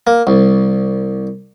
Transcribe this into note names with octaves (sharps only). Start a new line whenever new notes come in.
A#3
C2